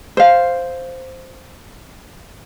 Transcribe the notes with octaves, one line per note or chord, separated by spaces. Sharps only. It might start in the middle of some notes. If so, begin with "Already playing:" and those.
C5 F5